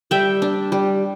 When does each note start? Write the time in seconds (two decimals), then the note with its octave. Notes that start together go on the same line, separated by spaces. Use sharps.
0.11 G3 E5 G5
0.42 D4
0.72 G3